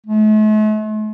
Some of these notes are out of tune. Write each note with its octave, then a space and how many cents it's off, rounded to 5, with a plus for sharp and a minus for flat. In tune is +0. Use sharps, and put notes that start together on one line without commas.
A3 -45